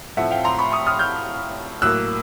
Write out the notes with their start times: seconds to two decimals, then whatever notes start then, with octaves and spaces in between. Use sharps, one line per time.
0.17 A2 F3 A3 C4 E5 F#5
0.31 F5 G5
0.45 A#5 C6
0.58 B5 C#6
0.72 C#6 D#6
0.87 D#6 F6
0.99 F6 G6
1.82 A2 F#3 A#3 E6 F#6